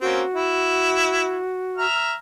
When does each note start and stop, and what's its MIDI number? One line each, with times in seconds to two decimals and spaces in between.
0.01 0.22 58
0.01 0.22 60
0.01 0.22 61
0.01 1.86 66
0.36 1.44 64
1.77 2.14 76
1.77 2.14 82
1.77 2.14 89